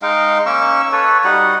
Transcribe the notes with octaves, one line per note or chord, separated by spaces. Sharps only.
G#3 D#4 F5 G5
A#3 C#4 C#6 E6
A4 B4 C#5
G3 D#4 F#4 F#5